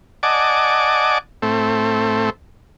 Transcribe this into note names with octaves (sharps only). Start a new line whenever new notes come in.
D5 D#5 F#5 G#5 A5 D6
A2 A3 C4